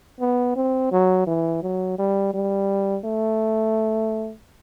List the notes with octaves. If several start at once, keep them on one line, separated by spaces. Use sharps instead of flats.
B3
C4
F#3
E3
F#3
G3
G3
A3